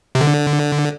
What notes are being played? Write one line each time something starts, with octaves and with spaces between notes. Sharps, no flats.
C3
D3